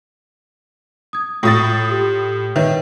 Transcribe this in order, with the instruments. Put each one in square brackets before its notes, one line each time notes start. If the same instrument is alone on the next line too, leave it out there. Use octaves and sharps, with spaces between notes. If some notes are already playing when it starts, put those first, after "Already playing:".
[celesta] D#6 G#6
[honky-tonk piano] A2 D#6 A6 [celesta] F4 F#4 C#6
[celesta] G4
[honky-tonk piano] D#3 [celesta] B4 C#5 E5